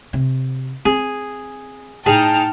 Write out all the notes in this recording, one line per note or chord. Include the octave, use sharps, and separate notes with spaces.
C3
C4 G#4
A2 D#4 G#4 G5 A5 F6